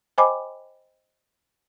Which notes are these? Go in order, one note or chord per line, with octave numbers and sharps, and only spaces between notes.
C5 D#5 G5 G#5 B5 D6